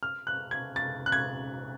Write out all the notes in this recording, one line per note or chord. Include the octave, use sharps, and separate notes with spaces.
F6
F#6
G#6
A6
F#6
G#6